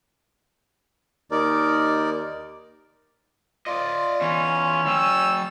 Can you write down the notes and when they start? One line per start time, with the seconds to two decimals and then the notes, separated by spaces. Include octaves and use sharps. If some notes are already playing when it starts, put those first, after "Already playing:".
1.31 D#2 D#4 A#4 D5
3.67 F4 D5 D#5
4.21 E2 E3 C#4
4.87 F#3 G5 E6